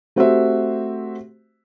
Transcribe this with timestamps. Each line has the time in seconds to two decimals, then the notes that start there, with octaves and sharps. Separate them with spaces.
0.16 A3 C4 F#4 G4 C5 E5